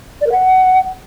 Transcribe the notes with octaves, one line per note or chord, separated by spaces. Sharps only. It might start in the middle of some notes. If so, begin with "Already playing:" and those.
D5
A#4
F#5